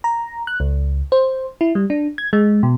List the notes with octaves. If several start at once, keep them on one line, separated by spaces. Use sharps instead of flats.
A#5
F#6
C#2
C5
E4
G3
D4
G#6
G#3
B2